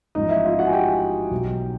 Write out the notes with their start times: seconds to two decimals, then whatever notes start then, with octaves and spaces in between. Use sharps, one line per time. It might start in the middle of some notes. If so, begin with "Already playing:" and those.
0.15 A1 G#2 F3 D#4 D#5
0.29 E4 E5
0.45 F4 F5
0.59 F#4 F#5
0.67 G#5
0.73 G4 G5
1.31 B1 B2 F#3